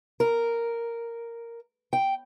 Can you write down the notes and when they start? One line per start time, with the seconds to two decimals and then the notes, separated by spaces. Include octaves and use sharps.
0.20 A#4
1.93 G5